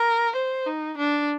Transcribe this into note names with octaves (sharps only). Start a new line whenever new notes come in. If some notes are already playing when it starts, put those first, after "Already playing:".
Already playing: A#4
C5
D#4
D4